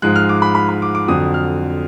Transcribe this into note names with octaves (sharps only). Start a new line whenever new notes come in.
G#2 F3 G#3 F#6
F6
D6
B5
B5
B5
D6
D6
F2 D3 F#3 D#6
F6